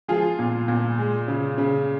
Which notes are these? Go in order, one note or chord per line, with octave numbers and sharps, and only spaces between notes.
F3 F4 G#4
A#2
A#2
G#3
C#3
C#3